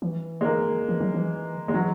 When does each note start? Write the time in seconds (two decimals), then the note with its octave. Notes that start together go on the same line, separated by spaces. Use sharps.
0.02 E3
0.41 G#3
0.44 A#3
0.89 E3
1.00 F#3
1.14 E3
1.68 G#3
1.74 E3 F#3